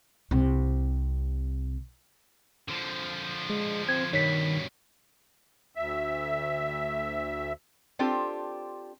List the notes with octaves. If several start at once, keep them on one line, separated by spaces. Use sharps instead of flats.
C2 C3
D3 F3
G#3
C4 G#6
G2 B2 D#3 C#5 B6
D2 E5
C4 D4 F4 G4 A4 C5